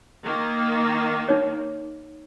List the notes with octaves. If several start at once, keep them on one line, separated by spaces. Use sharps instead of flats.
D#3 A#3
D#4 C#5